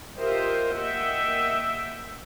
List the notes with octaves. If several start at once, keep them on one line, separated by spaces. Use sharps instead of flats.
F4 G4 A#4 C5 D#5 E5
A#3 D#5 E5 F#5 G5